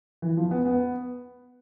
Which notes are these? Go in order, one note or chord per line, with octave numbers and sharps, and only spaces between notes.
E3
F3
B3
B3